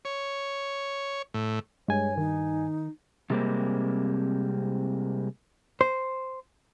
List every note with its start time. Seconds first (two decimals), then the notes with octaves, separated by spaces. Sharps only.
0.05 C#5
1.34 A2
1.88 G2 G#3 C#5 G#5
2.18 D#3 D#4
3.30 C3 G3 G#3 A#3 C4
5.81 C5